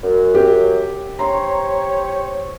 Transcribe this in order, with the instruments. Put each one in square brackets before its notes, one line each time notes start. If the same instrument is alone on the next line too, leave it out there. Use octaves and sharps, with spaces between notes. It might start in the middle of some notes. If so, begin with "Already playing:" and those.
[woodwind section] F#2
[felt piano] G4
[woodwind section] G4 C5 C#5 [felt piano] A#5 C6